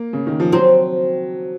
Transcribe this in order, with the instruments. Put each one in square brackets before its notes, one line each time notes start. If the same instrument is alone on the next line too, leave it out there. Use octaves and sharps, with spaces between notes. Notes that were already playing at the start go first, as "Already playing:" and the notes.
Already playing: [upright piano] A#3
C#3
D#3
F3
[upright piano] F#3 [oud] C4